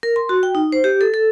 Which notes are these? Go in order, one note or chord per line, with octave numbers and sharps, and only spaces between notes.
A#4
C6
F#4
G5
D#4
C5
G4
A4
A4